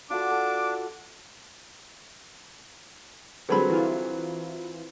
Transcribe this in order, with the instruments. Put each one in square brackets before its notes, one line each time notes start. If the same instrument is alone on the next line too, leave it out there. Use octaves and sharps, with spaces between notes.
[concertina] D4 [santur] F4 F#4 A4 [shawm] D6
[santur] A4
[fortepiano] D3 F#3 G3 [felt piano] C4 G#4 B4 [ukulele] A4 B5
[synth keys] E3 E4 F4